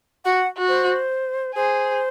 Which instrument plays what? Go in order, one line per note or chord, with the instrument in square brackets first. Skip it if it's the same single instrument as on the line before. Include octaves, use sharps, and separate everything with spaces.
[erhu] F#4 [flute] F#5
[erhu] F#4
[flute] C5
[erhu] G#4 [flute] C5